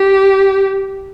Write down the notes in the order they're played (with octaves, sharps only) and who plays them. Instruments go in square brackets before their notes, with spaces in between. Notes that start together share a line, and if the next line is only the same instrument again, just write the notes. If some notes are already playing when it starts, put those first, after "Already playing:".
Already playing: [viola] G4